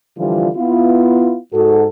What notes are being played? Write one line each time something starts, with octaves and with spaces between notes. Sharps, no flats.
D3 E3 F3 G3 F4
B3 E4 F4
G#2 F#4 A4